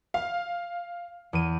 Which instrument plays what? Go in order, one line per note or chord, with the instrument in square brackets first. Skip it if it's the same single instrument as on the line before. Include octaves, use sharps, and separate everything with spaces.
[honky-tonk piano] F5
[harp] E2 D#7